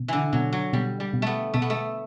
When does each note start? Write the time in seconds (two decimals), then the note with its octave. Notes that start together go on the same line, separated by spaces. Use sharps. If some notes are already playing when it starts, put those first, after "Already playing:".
Already playing: B2
0.08 D3 E3
0.33 B2 F#3
0.53 F#3
0.73 B2 G3
1.00 G3
1.13 B2
1.22 A3 B3
1.54 B2 A3
1.62 B3
1.70 A3